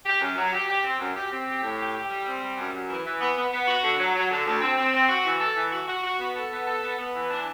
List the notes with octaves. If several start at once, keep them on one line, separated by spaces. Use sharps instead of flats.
G4
F#2
F#3
G4
G4
C4
F#2
G4
C4
G4
A2
G4
G4
G3
C4
G3
F#2
F#2
E3
E3
B3
B3
B3
F#4
D3
F#3
F#3
D3
D2
C4
C4
C4
F#4
E3
A4
E3
F#4
F#4
F#4
B3
A4
B3
A4
B3
B3
E3
D4